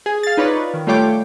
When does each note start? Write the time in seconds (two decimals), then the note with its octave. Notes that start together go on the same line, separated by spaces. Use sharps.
0.06 G#4
0.23 F5 A6
0.37 D#4 F4 B4 C#5 D5
0.74 D#3
0.87 G3 A3 F4 C#5 G5 D6